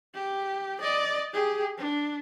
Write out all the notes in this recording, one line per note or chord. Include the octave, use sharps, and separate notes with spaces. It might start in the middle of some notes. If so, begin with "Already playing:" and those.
G4
D5 D#5
G4 G#4
D4